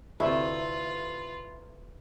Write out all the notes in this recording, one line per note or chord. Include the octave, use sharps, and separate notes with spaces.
D2 C3 A3 E4 F4 B4